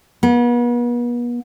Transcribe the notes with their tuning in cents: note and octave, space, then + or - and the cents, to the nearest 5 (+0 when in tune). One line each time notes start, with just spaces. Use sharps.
B3 -40